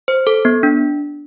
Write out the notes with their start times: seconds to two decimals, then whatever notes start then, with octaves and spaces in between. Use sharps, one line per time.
0.08 C5
0.27 A4
0.45 B3
0.63 D4